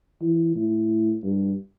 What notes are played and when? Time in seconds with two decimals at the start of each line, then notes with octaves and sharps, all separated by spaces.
0.21 E3
0.55 A2
1.23 G2